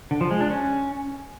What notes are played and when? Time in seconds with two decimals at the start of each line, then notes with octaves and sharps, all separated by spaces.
0.11 D3
0.21 F3
0.31 G#3
0.40 D4
0.50 C#4